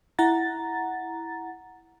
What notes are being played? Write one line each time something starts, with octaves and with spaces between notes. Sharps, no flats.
E4 F#5 A#5 A6